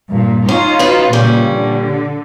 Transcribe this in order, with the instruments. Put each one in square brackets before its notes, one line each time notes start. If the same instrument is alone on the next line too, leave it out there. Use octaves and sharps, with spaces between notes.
[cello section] G2 A#2
[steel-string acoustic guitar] C#4 [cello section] D#4 F4
[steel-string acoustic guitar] C#4 F#4 B4
[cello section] A#2 C#3 [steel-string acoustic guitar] G3 C#4
[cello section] D3